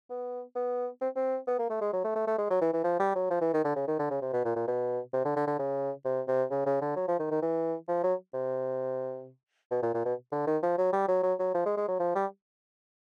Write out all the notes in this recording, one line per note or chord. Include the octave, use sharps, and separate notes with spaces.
B3
B3
C4
C4
B3
A#3
A3
G#3
F#3
A3
A3
A3
G#3
F#3
E3
E3
F3
G3
F#3
F3
E3
D#3
D3
C#3
D#3
D3
C#3
C3
B2
A#2
A#2
B2
C3
D3
D3
D3
C#3
C3
C3
C#3
C#3
D3
F#3
F3
D#3
D#3
E3
F3
F#3
C3
B2
A#2
A#2
B2
D3
D#3
F3
F#3
G3
F#3
F#3
F#3
F3
G#3
G#3
F#3
F3
G3